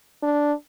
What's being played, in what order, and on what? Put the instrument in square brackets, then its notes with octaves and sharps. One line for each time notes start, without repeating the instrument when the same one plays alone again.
[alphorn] D4